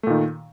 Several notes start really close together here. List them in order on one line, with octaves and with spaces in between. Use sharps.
A3 A#2 D#3